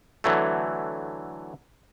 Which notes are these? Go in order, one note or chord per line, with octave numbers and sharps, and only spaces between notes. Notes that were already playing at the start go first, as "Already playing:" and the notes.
D3 E3 F#3 A3